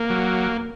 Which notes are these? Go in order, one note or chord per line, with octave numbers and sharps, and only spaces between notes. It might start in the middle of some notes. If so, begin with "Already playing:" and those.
Already playing: A#3
F#3